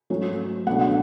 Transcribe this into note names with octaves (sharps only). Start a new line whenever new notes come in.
G#2 F#3 A3 C#4
C#2 B2 A3 D4 F#5
F#5